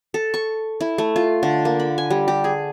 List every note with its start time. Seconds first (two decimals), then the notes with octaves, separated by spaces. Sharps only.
0.14 A4
0.34 C#6
0.81 E4
0.98 A3
1.16 F4
1.43 D3
1.65 A#3
1.80 B5
1.98 G#5
2.10 G3
2.28 G4
2.44 G#4